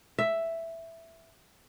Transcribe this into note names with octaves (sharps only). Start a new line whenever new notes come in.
E5